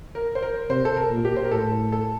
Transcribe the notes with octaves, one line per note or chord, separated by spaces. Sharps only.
A#4
C5
A#4
C3 C5
A4
A#4
A#2
G4
C5
A#4
A2 A4
A4